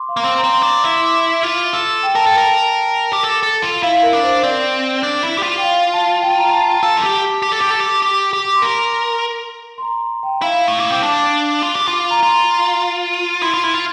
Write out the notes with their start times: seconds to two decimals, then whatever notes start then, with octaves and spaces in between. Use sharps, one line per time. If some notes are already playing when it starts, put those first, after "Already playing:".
Already playing: C6 D6
0.09 F5
0.17 A#3
0.23 C4 C6
0.38 A#5
0.44 C4
0.53 C6
0.63 D4
0.83 E4 C6
0.90 D6
0.98 C6
1.43 F4
1.73 A4
2.03 G5
2.15 A#4 A5
2.26 A4 G5
2.38 A#4
3.13 G4
3.23 A4
3.43 A4
3.62 F4
3.83 E4 F5
4.03 A#4
4.13 D4
4.23 C5
4.43 C4 D5
5.03 D4
5.23 E4
5.38 G4
5.43 F4
5.58 G5
5.63 F5
5.93 A5
6.22 G5
6.38 A#5
6.52 A5
6.68 G5
6.83 A4 A5
6.97 F4
7.03 G4
7.42 G4
7.52 A4
7.61 G4
7.71 A4
7.80 G4
8.02 G4
8.33 G4
8.55 C6
8.62 A#4 A#5
9.78 C6
9.82 A#5
10.23 G5
10.42 E4 F5
10.68 A3
10.80 A#3
10.91 C4
11.02 D4 A5
11.62 F4
11.76 G4
11.88 F4
12.11 A#5
12.23 F4 C6
13.42 E4 C6
13.54 F4
13.64 E4
13.74 F4